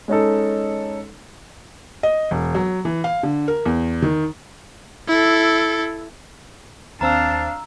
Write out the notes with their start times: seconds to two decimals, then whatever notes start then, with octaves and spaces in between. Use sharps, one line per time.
0.08 G#3 C#4 D#4 A4
2.03 D#5
2.31 E1
2.55 F#3
2.85 E3
3.04 F5
3.23 D3
3.48 A#4
3.66 E2
4.02 D#3
5.08 E4 A4
7.01 D#2 C4 D4 F5 A5 A#5 E6